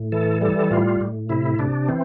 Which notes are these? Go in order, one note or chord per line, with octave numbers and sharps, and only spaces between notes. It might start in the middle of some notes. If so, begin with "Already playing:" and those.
Already playing: A2
E3 A4
G3 A4
A2 F4
A2
C3 E4
C3 D4
E3 C4